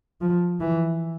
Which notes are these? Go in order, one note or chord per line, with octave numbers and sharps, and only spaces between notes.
F3
E3